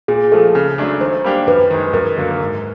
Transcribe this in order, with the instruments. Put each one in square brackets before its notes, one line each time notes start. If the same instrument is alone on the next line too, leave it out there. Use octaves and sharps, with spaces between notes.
[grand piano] A#2 [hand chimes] G#4
[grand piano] F3 A3 [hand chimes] A4
[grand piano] C#3
F#3 A3 D4
[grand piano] D#3 [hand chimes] C5
[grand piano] G3 A#3 D4 G4
[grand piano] F#2 [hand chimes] B4
[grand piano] D#3 G#3
[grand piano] F#2 [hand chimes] A#4
[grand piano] D3 F#3 A#3
G#2